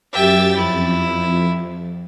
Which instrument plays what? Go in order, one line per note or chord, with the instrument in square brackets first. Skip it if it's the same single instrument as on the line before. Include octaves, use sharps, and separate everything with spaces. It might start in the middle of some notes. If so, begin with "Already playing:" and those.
[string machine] F#2 G4 A6 [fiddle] E5 G5
[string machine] F2 [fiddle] E4